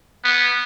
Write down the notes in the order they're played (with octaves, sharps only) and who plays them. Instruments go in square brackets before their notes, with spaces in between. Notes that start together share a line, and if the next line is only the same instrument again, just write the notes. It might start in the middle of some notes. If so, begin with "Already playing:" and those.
[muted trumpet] B3